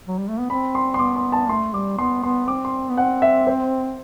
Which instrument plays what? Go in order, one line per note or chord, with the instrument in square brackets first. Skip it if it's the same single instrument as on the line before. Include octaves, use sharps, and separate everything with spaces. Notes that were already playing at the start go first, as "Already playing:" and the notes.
[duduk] F#3
G3
A3
B3
[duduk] C4 [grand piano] B5
[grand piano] C6
C6
[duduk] B3 [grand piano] D6
[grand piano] C6
A5
[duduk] A3 [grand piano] C6
[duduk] G3 [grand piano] D6
[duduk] B3 [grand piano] C6
[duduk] B3 [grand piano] C6
[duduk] C4 [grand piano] D6
[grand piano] C6
[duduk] B3
[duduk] C4 [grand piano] F#5
[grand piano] E5
C5